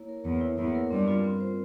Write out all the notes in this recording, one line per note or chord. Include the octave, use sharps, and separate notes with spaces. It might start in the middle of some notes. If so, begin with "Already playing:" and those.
Already playing: A#3 E4 C#5
A#4
E2 C#5
E4
E2 A#3
A#4
G2 C4
F4
C4
C5